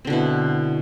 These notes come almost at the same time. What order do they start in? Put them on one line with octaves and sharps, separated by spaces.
C4 D3 B2 E4